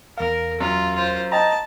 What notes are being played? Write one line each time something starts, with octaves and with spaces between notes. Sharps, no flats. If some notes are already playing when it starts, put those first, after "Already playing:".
E2 A#4 F5
F#2 F4
F4 C5
D#5 G5 A5 A#5